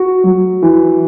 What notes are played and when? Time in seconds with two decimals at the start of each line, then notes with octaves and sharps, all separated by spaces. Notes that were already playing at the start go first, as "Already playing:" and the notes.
Already playing: F#4
0.24 F#3
0.63 E3